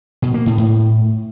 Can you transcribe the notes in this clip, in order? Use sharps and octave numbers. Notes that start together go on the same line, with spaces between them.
B2
A#3
A2
A2